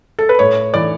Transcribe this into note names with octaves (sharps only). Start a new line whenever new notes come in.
A4
B4
A2 C#5
E3 D5